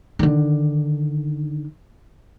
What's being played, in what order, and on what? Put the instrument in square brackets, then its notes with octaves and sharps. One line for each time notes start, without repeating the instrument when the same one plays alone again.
[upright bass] D3 D#3